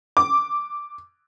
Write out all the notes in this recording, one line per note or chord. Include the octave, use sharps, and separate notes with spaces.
D6